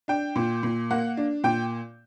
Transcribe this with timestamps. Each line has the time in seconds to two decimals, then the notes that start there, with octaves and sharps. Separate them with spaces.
0.08 D4 G5
0.36 A#2
0.63 A#2
0.91 A#3 F#5
1.17 D4
1.44 A#2 G5